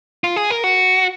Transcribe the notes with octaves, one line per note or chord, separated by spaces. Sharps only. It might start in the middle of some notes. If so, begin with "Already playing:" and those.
F4
G#4
A#4
F#4